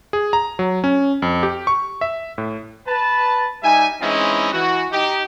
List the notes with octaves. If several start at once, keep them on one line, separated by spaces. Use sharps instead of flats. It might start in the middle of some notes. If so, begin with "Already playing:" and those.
G#4
A#5
F#3
C#4
F2
G4
C#6
E5
A2
B4 A5
G3 D#4 E5 G#5
E3 G#3 C4 C#4 D#4 E4
E3 F#4
D#4 G4